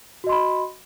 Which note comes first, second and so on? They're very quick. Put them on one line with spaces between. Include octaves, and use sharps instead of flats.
F#4 D#5 C6 B5